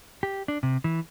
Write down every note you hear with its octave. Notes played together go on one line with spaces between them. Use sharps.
G4
D4
C3
E3